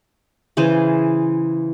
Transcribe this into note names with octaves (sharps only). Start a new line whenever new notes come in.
C#3 E3 G#4 C5